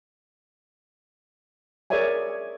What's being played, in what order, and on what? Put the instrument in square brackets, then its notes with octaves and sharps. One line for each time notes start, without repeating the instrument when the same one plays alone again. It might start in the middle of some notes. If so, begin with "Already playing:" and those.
[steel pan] G#4 A#4 C#5 D5 E5 G#5